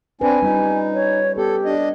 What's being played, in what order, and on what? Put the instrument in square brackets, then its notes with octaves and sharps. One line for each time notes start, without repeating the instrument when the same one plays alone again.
[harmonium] C4 D4 [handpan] B4 [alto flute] G#5
[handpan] G3 C#4 F4 [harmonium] D#4
[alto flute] C#5
[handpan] B3 [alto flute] G4 [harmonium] A4
[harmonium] D4 D#5